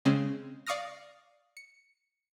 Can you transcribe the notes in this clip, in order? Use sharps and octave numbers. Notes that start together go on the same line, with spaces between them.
C#3 G#3 C4 C#4
D5 F5 C#6 D#6 F6 A#6
C#7